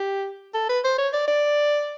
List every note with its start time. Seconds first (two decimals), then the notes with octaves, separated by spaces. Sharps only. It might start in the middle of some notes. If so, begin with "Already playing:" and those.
Already playing: G4
0.54 A4
0.69 B4
0.84 C5
0.98 C#5
1.13 D5
1.28 D5